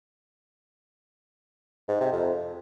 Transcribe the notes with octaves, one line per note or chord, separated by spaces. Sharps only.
G#2
C3
F2